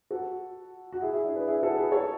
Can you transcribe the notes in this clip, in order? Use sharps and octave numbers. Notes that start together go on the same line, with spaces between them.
F#4 A4
F#4
E4 G#4
E4 G#4
D4
G#4 B4
E4 G#4
F#4 A4
G#4 B4
A4 C#5